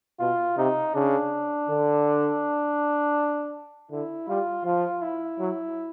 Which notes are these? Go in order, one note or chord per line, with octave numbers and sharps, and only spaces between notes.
B2 F4
C3 D#4
C#3 D4
D3
D3 E4
G3 F4
F3 F4
E4
F#3